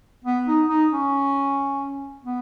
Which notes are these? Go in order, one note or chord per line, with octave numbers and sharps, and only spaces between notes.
B3
D#4
D#4
C#4
B3